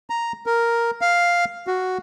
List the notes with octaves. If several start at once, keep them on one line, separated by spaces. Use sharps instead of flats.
A#5
A#4
F5
F#4